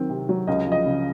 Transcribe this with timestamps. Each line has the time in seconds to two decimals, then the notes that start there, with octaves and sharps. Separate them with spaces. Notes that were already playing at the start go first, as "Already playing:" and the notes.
Already playing: D#3 F#3 C4
0.09 C3
0.29 F#3
0.47 C#2 D#5
0.67 F3 D#5
0.86 C#3